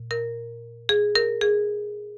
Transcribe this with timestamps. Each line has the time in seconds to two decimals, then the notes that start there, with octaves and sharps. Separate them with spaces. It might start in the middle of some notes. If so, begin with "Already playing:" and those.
Already playing: A#2
0.11 A#4
0.89 G#4
1.15 A#4
1.41 G#4